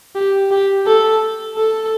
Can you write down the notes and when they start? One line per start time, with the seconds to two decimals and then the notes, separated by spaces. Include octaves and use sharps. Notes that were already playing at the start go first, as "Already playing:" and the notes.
0.15 G4
0.51 G4
0.87 A4
1.57 A4